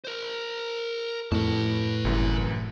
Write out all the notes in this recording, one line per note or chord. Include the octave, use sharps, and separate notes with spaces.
A#4 C5
F2 A2 B4 A5
G1 C2 F#2 E3